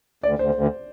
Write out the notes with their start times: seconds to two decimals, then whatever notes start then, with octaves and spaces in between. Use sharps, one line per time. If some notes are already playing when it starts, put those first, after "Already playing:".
0.23 D2 D5
0.39 D2 C5
0.54 D2